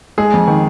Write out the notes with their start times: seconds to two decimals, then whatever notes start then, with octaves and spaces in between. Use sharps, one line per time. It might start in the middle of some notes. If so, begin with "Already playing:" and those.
0.18 G#3 G#4
0.34 F2
0.48 D#3